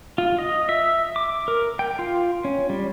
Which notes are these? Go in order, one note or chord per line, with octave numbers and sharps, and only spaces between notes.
F4
D#5
E5
D6
A#4
G5
F4
C#4
G3